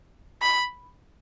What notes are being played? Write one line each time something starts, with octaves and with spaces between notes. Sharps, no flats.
B5